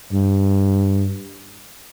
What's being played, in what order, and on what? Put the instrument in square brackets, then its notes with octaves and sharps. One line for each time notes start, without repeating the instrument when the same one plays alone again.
[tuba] G2